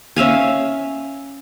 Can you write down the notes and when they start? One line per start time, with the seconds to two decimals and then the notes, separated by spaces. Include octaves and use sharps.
0.16 C#4 E5 F5 G#5